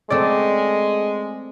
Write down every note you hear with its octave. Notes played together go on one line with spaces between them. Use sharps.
G#3 A3 C4 D5